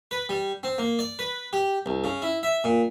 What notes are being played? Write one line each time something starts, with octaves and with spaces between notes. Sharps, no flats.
B4
G3
C4
A#3
D5
B4
G4
C2
C#3
E4
E5
A#2